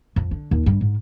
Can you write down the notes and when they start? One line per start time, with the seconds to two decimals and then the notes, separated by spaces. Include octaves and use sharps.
0.16 F2
0.31 D3
0.51 D#2
0.66 G2
0.81 G#2